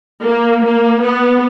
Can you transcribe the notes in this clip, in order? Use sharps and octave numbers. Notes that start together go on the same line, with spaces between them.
A#3
A#3
B3